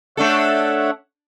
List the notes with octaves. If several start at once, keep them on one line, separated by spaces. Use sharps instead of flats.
A3 D4 A4 C#5 E5 F#5